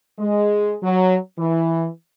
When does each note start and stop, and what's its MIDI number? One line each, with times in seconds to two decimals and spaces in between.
0.19 0.77 56
0.83 1.16 54
1.38 1.87 52